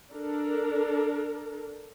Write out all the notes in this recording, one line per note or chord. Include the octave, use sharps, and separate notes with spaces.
D4 A4 A#4